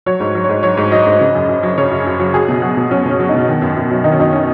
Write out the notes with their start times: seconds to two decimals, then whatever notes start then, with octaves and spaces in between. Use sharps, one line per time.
0.06 F#3 C#5
0.20 G#2
0.35 F#3
0.44 C#5
0.49 G#2
0.63 F#3 C#5
0.77 G#2
0.92 F#3 D#5
1.06 G#2
1.21 C#3
1.35 F#2
1.49 F#2
1.63 F#3
1.78 C#3 C#5
1.91 F#2
2.06 F#2
2.19 F#3
2.34 F#3 G#4
2.49 B2
2.62 F#3 F#4
2.77 B2
2.91 F#3 C#4
3.05 B2 C#4
3.20 F#3
3.29 B2 D#4
3.48 D#3
3.62 F#2
3.76 F#2
3.90 F#3
4.04 D#3 D#4
4.12 C#4
4.19 F#2 D#4
4.33 C#4